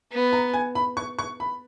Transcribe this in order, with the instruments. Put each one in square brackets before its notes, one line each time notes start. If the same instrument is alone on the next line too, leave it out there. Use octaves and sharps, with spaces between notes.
[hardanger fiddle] B3
[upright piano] A#5
G#5
B5
C#6
C#6
B5